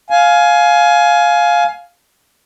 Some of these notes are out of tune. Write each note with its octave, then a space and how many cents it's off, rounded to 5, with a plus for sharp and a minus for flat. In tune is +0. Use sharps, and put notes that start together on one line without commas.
F5 +5 G#5 +20